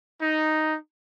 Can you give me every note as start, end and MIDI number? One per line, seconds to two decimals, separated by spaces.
0.20 0.75 63